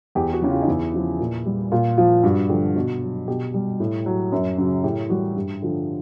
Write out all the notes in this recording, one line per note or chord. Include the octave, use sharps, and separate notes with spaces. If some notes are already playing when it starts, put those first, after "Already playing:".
E2 G4
F#4
C#3 E3
F4
D#4
E2 E4
C#3 F3
A#2
G3
A#2 F4
F3 F4
G2 F#4
D3 F3 G4
B2 F#4
F#3
B2 G4
G3
A2
F#3
F#2
C#3 F#3
A2 G4
E3 G3 F#4
G2 G4
D3 F3